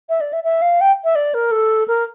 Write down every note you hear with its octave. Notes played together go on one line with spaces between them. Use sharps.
E5
D5
E5
E5
F5
G5
E5
D5
A#4
A4
A#4